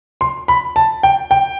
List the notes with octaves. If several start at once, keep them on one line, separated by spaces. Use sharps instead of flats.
C6
B5
A5
G5
G5